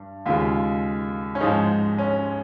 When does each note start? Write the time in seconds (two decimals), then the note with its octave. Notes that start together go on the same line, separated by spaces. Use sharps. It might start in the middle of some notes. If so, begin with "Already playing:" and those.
Already playing: G2
0.26 D#2 C#3 G#3 F4
1.35 C#4
1.41 G#2 F3 G#3 D#4
1.99 C#4